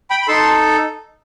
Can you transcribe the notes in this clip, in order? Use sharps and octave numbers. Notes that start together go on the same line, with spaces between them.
G5 B5
B5
D#4 A4 A5 C6